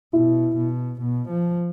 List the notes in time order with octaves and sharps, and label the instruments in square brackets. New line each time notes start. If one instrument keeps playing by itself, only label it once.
[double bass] B2 [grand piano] E4
[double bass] B2
B2
F3